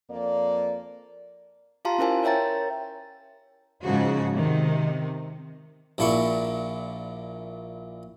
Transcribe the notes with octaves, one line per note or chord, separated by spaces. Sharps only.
F2 A#3 D5
F4 G4 F5 A5 A#5 C6
C#4 E4 A#4 C5 G#5 A5
A#4 C#5 E5 G5 A#5 A6
G#2 C#3 F3 F#4
C3 D#3
A#1 A#2 D4 E4 C#6